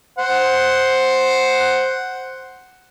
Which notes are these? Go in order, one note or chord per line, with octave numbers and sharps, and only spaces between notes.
C5 F#5